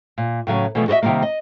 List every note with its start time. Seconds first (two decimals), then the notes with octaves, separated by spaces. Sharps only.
0.18 A#2
0.47 A2 C#3 F#3 C#4
0.75 B2 E3 F3 A3 B3
0.88 F#4 A4 C5 D#5 E5
1.03 C3 D#3 F3 G3 A3 A#3
1.22 D#5